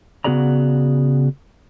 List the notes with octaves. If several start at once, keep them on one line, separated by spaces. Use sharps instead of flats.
C#3 B3 F#4 G#4 D5 A#5